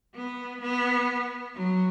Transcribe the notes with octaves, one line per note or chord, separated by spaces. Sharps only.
B3
B3
F#3